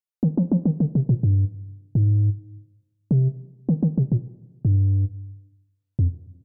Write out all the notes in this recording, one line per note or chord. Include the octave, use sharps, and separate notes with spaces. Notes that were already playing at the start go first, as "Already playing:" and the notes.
D#3
F3
F3
D#3
D3
C3
A#2
G2
G#2
C3
D#3
D#3
C3
A#2
G2
F2